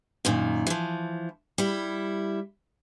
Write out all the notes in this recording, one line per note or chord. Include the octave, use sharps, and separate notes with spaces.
F#2 A#2 D#3
E3 F3
G3 E4